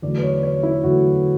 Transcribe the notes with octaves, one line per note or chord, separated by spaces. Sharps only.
E2 D3 F#3 A3 D5
B4
C#5
C#5
E4
E2 D3 F#3 A3 F#4